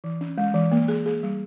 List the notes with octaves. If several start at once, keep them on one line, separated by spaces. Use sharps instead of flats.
E3
C#4
G#3
E3
A#3
G#4
G#4
G3